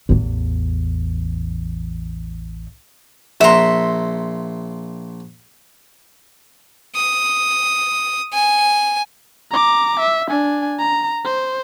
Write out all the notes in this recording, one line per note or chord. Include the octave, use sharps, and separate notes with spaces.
A1 E2
A#1 E5 F#5 A#5 C6
D#6
G#5
A#5 D6
E5
D4 G#5
A#5
C5